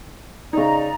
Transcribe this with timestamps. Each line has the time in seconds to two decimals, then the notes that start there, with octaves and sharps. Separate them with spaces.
0.53 C#3 D#4 D5 D#5 A#5